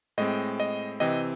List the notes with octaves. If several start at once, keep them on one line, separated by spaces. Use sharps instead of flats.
A2 G#3 C4 D#5
D#5
C3 E3 C4 D#5